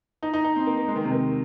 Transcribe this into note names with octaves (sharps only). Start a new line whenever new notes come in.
D#4
D#4
D#4
C4
A#3
A#3
G#3
D#3
C3
D#3